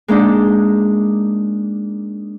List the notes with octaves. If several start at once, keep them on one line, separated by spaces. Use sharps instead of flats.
G#3 A#3 D4 D#4